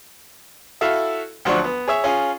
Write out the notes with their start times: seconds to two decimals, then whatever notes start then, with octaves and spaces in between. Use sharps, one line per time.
0.81 E4 F#4 A4 E5 F5
1.45 D2 F3 F#3 D4 C#6
1.64 B3
1.87 G#4 C#5 E5
2.04 C#4 F4 G#4